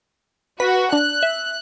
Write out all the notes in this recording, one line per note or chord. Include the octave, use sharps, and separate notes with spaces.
F#4 B4 B6
D4 F#6
E5